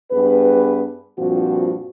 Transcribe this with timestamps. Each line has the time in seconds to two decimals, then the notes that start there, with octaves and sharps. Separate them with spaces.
0.11 G2 B3 G#4 B4
1.18 G2 A#2 F3 C4 F#4